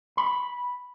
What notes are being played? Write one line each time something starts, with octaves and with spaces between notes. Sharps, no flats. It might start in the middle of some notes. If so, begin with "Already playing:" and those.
B5